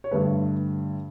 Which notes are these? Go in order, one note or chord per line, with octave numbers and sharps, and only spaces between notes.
C#5
G2 D3 A3 B4